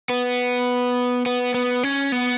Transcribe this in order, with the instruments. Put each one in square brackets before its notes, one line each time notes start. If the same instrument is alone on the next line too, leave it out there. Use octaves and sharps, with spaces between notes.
[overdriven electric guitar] B3
B3
B3
C#4
B3